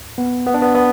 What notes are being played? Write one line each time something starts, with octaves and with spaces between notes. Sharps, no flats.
B3
B3
D4
B3
B3